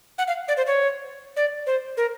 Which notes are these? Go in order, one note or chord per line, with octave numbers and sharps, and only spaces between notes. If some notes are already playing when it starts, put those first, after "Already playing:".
F#5
F5
D5
C5
C#5
D5
C5
A#4